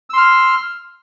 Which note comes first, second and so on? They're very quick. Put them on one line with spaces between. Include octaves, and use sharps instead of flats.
E6 C6 F6